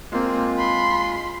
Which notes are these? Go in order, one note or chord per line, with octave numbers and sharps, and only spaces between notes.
G#3 A#3 C4 F4
B5 C6